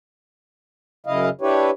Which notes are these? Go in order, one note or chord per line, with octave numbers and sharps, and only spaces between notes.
F#2 C#3 E4 D#5 F5
D4 E4 G4 B4 C#5